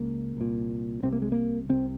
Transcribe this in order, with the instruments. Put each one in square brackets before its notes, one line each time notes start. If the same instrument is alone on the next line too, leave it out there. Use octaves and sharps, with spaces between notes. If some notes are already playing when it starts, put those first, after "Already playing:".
Already playing: [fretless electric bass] C#2 C#3 A#3
C2 A#2
C2 C3 C4
A#3
G#3
A#3
C2 C3 C4